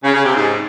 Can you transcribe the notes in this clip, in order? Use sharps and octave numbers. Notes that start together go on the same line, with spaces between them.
C#3
C#3
C3
G#2